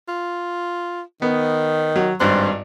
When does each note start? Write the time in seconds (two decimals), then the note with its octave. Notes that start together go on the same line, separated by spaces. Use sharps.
0.08 F4
1.22 D#3 B3
1.96 F#3
2.20 G#1 G2 C5 F#6